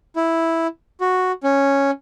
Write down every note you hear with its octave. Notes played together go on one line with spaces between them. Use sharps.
E4
F#4
C#4